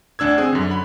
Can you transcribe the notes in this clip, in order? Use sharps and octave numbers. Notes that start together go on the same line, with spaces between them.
D2 D4 E6 G#6
C4 G#4
F#2 D3
B5